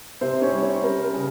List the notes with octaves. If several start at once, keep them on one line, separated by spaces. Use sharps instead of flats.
C3 C4 C5
C#4 C#5
G3
C#4 C#5
G3 A#4
A#4
C#3